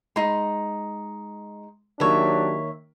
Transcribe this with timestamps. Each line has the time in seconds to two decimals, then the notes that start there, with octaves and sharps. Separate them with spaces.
0.16 G#3 D#4 C6
2.00 D#3 F#3 A#3 D4 G4 C#5 E5